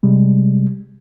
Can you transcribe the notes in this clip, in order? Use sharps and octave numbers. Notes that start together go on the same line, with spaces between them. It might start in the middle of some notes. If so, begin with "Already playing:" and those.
C3 G3 G#3